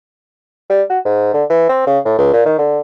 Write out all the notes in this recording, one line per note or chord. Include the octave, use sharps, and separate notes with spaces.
G3
F#4
G#2
D3
E3
C4
C#3
A2
C#2
A#2
D#3
D3